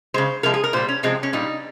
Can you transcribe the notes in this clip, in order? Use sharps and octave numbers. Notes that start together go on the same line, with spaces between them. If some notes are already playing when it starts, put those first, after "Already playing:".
C#3 G#3 C5
C3 F3 G#3 A#4
G#4
A#4
A#2 G3 C5
C#4
C3 F3 G#3 C4
C#4
A#2 G3 D#4